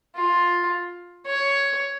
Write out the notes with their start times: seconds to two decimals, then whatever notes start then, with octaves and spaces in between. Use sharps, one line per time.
0.15 F4
1.26 C#5